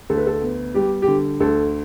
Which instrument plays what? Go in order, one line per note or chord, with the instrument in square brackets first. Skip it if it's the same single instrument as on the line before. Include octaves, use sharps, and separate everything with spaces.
[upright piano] D2 A4
B4
A4
B3
G3 G4
G4
D3
D2 A4